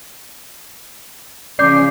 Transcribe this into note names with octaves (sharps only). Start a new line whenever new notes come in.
C#3 F3 D5 D6 G6 C7